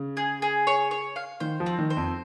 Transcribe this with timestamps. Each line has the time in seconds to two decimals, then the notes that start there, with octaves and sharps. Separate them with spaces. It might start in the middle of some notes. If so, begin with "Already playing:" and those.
Already playing: C#3
0.17 G#4
0.42 G#4
0.67 C#5
0.91 C#5
1.16 F5
1.40 D#3 C5
1.60 F3
1.66 C4
1.79 D#3
1.90 C5
1.97 F2